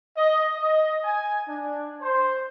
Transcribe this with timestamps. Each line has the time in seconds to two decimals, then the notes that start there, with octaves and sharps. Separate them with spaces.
0.16 D#5
0.58 D#5
1.04 G#5
1.49 D4
2.02 C5